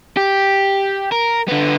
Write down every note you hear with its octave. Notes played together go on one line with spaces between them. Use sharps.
G4
A#4
D3 B3